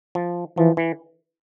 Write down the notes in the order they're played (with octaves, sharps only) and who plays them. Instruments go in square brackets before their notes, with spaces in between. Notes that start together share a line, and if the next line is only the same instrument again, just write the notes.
[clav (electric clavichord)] F3
[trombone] E3 [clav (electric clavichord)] F3
[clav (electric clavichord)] E3